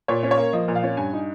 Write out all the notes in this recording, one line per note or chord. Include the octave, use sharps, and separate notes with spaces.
A#2 C#5
C#4
C#5
A#3
F3 D#5
A#2
F5
C#4
G2 G#5
D#4